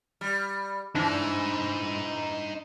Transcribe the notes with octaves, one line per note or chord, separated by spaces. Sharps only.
G3
E3 D4 D#4 C5